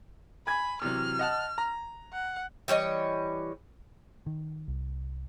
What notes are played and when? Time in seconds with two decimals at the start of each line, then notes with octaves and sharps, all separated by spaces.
0.47 G#5 B5 G#6
0.82 C3 E3 F#3 F6
1.19 D#5 F#5 A5
1.58 A#5
2.13 F#5
2.68 E3 G3 C#5 D#5
4.26 D#3
4.68 C2